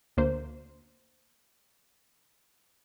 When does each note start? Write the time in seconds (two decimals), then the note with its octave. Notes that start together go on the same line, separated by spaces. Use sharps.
0.17 D2 A#3 C5